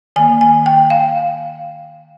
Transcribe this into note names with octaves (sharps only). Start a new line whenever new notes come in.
D#3 A#3 G#5
G#5
G5
F5